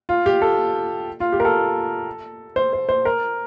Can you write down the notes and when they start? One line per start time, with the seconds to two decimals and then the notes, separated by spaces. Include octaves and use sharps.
0.09 F4
0.26 G4
0.42 A4
1.20 F4
1.32 G4
1.40 A#4
1.45 A4
2.56 C5
2.73 C5
2.89 C5
3.05 A#4